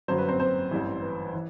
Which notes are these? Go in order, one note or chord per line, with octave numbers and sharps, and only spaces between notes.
G1 F#2 F#3 C5
B4
C4 C5
C4 C5
A1 G2 E3
B4
E3